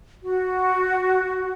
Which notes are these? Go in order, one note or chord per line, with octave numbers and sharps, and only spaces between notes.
F#4